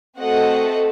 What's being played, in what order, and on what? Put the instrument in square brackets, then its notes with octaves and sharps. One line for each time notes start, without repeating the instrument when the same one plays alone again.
[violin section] A3 C4 F#4 A4 D#5 F#5